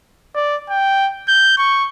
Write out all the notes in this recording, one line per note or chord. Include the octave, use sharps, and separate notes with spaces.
D5
G5
G6
C#6